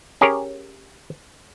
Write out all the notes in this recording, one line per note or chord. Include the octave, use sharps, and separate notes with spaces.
C#4 G4 G#4 A#4 C#5